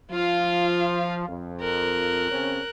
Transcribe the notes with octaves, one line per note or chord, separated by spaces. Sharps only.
F3 F4 F5
F2
A#4 F#6
C#3 C4 C#4